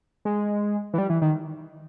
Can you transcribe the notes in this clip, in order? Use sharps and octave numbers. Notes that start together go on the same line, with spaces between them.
G#3
E3
G3
E3
D#3